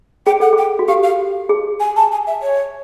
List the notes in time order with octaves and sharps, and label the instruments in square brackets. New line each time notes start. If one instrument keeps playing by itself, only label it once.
[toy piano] G#4 [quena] G5
[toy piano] A4 [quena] F#5
[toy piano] G#4 [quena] G5
[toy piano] F#4
[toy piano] G4 [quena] F5
[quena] F5
[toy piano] G#4
[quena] G#5
A5
G#5
E5
C#5